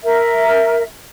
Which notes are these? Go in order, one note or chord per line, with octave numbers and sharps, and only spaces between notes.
A#4 E5